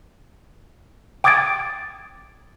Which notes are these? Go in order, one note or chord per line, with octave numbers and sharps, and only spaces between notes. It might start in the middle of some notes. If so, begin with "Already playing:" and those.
G5 D6 D#6 G#6 A6 D7